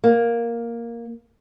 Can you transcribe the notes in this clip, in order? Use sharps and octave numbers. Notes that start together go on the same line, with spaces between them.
A#3